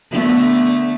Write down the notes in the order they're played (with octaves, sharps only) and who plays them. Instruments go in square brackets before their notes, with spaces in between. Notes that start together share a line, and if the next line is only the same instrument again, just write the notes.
[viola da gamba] D3 A3 B3